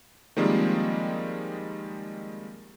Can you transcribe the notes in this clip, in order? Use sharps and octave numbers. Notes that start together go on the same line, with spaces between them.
D#3 F3 G3 G#3 A#3 C4